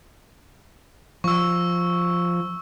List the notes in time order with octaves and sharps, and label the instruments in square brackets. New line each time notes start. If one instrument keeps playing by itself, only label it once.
[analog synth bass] F3 [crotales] C#6 E6